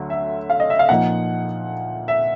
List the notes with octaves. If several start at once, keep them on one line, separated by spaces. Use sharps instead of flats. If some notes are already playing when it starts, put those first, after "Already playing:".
Already playing: D2 D3 F#3
E5
F5
D#5
E5
F5
A#2 F3 A#3 D#4 F#5
E5